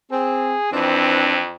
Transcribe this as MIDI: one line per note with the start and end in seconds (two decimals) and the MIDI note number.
0.12 0.55 60
0.12 0.72 68
0.72 1.54 41
0.72 1.43 52
0.72 1.43 60
0.72 1.43 62